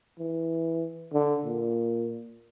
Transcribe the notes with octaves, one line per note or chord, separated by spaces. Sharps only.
E3
D3
A#2